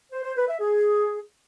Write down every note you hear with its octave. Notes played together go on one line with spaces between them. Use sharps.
C5
C5
B4
E5
G#4